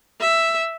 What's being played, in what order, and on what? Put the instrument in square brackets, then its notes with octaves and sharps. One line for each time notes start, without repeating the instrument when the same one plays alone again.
[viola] E5